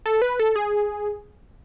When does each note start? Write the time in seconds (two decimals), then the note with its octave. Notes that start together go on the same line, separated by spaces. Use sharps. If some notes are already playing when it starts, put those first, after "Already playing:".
0.06 A4
0.22 B4
0.39 A4
0.56 G#4